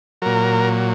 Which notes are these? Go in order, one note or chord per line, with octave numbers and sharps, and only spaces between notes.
A#2 F#3 A#4